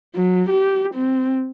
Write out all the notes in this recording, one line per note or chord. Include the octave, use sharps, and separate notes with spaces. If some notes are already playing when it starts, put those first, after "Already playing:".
F#3
G4
C4